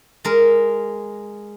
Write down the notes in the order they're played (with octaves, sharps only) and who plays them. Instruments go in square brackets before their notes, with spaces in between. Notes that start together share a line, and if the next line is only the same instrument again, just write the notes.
[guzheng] G#3 A#4